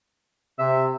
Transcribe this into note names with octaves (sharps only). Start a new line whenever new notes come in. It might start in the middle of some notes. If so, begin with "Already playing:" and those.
C3 E5